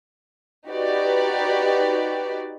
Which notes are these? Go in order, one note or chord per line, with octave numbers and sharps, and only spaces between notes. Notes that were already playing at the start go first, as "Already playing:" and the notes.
D#4 F#4 G4 B4 D5